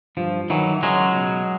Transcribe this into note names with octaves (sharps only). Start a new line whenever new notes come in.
G2 F3
D#3 E3 F#3
C#2 F#3 G#3
B2